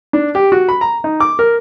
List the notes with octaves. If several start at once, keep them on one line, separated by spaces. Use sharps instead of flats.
D4
G4
F#4
B5
A#5
D#4
D6
A#4